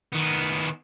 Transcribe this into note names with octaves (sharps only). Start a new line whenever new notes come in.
D#3 B3